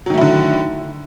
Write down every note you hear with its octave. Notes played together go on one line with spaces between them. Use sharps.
D3 D#3 F#3 A3 E4